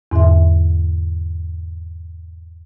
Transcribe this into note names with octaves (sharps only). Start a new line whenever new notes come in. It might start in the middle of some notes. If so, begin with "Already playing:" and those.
E2 G#2 D3 E5